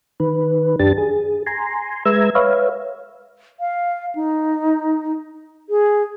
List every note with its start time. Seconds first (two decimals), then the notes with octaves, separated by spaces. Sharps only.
0.20 D#3 B4
0.80 F#2 D4 G4 A5 A6
0.98 G#4
1.47 G#5 A#5 C6
2.05 G#3 B4 E5 A#5 E6 G#6
2.35 B4 C#5 E5 F5
3.60 F5
4.15 D#4
5.69 G#4